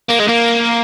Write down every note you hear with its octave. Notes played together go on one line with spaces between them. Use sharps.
A#3
G#3
A#3